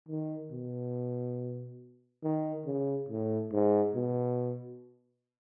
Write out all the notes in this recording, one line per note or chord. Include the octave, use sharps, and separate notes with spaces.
D#3
B2
D#3
C#3
A2
G#2
B2